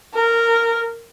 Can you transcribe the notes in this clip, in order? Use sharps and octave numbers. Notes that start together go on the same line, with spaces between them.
A#4